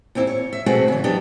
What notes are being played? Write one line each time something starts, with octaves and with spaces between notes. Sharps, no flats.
D#2 G#2 C4 E4
C#5
E5
B2 G#3 A3 C4 F#4 G#4
C#3 E3
F#3 B3 D4 G4